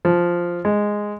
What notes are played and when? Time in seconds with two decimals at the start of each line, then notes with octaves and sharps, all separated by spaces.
0.05 F3
0.65 G#3